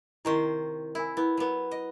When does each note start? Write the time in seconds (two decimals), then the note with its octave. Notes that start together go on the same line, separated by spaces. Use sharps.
0.25 C3 D#3 E4 C5 A#5 C#6
0.95 E4 A#4 G#5
1.17 B3 E4
1.37 F#3 B3
1.71 D#5